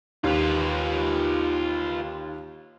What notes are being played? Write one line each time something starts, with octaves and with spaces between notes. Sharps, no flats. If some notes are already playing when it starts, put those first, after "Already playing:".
D#2 F4 B4